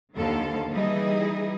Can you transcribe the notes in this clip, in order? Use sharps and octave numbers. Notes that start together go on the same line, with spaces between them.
D#2 D3 D#3 F3 A4 F5
E3 G3 D#4 E4 G#4 D#5